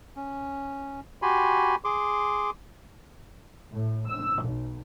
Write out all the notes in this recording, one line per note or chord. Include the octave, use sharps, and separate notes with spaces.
C#4
F#4 G4 G#5 B5 C6
G#4 C6 D6
A2
E6
B1